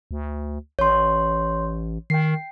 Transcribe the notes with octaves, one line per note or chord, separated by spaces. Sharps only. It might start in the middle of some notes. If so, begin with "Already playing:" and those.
D2
A1 C#5 C6
D#3 G5 C7